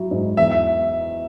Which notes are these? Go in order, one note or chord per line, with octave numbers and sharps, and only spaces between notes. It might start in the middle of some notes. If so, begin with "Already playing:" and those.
Already playing: F#3 E4
G#2
E2 E5
E5